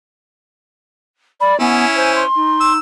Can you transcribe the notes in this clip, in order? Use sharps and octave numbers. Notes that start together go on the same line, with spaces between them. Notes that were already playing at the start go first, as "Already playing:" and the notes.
D5 B5
B3 C#4 E4 G#5
C5 G#5
C6
D#4
E6